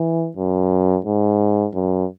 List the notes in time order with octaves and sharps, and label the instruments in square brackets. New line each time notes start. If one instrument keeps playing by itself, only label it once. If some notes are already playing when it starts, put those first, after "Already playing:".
Already playing: [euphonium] E3
F#2
G#2
F#2